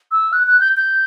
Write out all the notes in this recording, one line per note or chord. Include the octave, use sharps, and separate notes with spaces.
E6
F#6
F#6
G6
G6